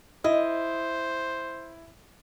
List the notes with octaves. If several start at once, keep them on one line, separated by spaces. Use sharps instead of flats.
E4 C5 D#5